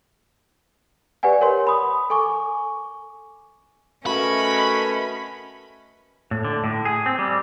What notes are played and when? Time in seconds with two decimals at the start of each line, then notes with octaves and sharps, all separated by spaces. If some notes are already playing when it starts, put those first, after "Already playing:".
1.23 G4 B4 D5 F#5 G#5
1.41 A#4 C#5 F#5 C6
1.67 B5 D#6
2.10 A4 G#5 C#6 D6
4.06 A3 C#4 F#4 A#4 B4 D#5 B5
6.31 A2
6.44 D3
6.64 A2
6.85 G#4
7.06 C4
7.19 G3